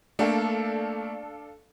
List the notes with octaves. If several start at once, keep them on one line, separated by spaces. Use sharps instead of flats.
A3 A#3 D4 A4 F5